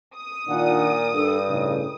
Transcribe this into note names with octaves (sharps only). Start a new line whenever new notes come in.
D#6
A#2 D#3 D4 F4 F#5
G2 D4 A4
A2 C#3 C#4 D#4